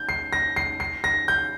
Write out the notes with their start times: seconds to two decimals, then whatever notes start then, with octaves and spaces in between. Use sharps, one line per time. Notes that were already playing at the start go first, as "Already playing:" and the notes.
Already playing: G6
0.09 C7
0.33 A#6
0.56 C7
0.80 C7
1.04 A#6
1.28 G6